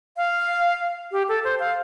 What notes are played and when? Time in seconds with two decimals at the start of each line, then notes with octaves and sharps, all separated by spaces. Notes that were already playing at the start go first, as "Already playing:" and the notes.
0.17 F5
1.12 G4
1.29 A4
1.44 C5
1.60 F5